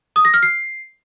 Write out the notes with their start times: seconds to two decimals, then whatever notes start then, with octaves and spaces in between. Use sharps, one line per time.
0.16 D#6
0.25 A#6
0.34 F6
0.43 C7